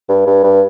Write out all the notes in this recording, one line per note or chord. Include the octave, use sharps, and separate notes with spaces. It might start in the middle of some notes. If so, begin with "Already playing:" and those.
G2
G2
G2